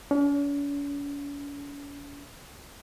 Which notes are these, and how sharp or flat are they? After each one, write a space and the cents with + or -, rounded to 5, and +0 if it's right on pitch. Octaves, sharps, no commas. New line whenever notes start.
C#4 +45